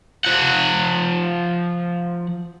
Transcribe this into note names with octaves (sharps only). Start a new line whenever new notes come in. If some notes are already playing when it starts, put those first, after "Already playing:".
F3 F#5